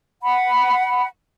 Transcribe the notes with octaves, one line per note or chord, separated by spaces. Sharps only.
F#5 B5